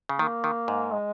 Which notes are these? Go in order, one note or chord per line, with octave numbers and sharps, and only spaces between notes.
C#3
D#3 A#3
D#3
G#2
G#3